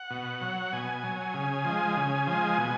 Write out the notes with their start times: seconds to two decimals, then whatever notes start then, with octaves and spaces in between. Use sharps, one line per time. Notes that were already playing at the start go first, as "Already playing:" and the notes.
Already playing: F#5
0.10 B2
0.41 F#3
0.73 B2 G#5
1.03 F#3
1.34 C#3
1.65 F3 G#3
1.97 C#3
2.27 F3 G#3
2.58 B2